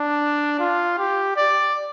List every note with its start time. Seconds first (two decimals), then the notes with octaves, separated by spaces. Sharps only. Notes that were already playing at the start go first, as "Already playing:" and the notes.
Already playing: D4
0.60 F4
0.98 G4
1.37 D5